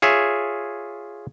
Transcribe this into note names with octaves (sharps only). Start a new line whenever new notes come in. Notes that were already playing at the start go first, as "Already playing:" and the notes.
F4 G#4 C#5 E5